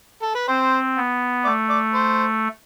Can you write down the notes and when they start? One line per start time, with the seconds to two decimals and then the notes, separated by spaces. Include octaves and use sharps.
0.23 A4
0.35 B4
0.48 C4 C5
0.97 B3
1.45 A3 D5
1.70 D5
1.94 C5